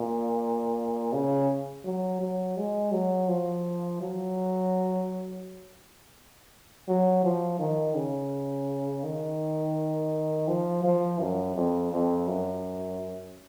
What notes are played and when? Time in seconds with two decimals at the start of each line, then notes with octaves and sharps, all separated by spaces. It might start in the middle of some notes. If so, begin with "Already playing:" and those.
Already playing: A#2
1.13 C#3
1.85 F#3
2.21 F#3
2.57 G#3
2.92 F#3
3.29 F3
4.01 F#3
6.88 F#3
7.24 F3
7.60 D#3
7.96 C#3
9.04 D#3
10.48 F3
10.84 F3
11.20 F#2
11.56 F2
11.92 F2
12.28 F#2